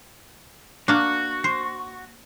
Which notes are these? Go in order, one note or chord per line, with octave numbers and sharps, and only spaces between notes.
A#3 D4 F#4
C5